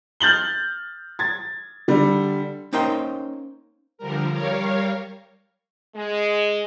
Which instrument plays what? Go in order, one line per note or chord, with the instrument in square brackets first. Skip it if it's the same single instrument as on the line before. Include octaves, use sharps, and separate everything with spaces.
[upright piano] F6 G6 A6 F#7 G7
G#6 A6
D3 G3
[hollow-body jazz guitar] A#3 C#4 D#4 A#4 C5 G5
[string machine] D3 F3 G3 A#4
G3 A#4 C#5 F5
[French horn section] G#3